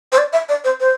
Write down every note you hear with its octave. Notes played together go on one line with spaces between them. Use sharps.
C5
D5
E5
D5
C5
C5